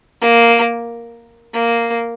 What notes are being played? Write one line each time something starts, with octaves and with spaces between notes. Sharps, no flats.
A#3
A#3